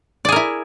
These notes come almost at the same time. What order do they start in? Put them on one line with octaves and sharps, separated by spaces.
D5 G#4 A#4 E4